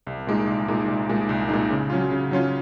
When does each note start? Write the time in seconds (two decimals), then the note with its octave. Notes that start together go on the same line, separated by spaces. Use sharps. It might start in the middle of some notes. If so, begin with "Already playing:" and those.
0.07 C2
0.27 A#2 G#3 D#4
0.47 C2
0.68 A#2 G#3 D#4
0.88 C2
1.09 A#2 G#3 D#4
1.29 C2
1.49 A#2 G#3 D#4
1.70 C#3
1.90 F#3 C#4 F4
2.11 C#3
2.31 F#3 C#4 F4